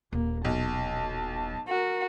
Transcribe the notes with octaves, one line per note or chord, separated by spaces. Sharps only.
D#1 A#3
B1 A5
F#4 A#4